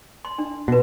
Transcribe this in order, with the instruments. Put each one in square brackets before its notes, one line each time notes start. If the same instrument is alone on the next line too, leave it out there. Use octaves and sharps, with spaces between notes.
[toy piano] C6
D4
[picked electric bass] B2 [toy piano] F#4 B4